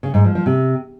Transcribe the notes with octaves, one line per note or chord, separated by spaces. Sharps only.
C#3
G#2
F3
F3
C3